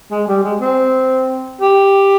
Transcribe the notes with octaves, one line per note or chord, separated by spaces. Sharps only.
G#3
G3
G#3
C4
G4